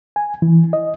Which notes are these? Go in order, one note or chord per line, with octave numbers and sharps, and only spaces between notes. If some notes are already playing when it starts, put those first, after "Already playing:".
G#5
E3
D#5